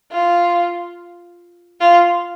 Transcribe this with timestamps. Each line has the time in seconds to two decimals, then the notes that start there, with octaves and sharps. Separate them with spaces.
0.12 F4
1.81 F4